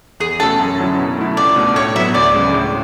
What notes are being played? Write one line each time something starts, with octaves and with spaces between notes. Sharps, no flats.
E2 G#4
B2 A3 C#4 F#4 A4
F#2
D3 F#3 C#4 E4
B2
A3 E4
C#2 D5
B2 A3 D4
A2 C#5
F#3 B3 E5
D2 D5
C#3 G#3
A2